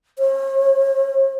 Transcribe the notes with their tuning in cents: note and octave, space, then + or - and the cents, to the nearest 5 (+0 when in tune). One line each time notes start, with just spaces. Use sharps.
C#5 -45